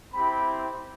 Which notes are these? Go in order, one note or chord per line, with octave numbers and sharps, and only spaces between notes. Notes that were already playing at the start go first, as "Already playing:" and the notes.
C4 E4 G4 B5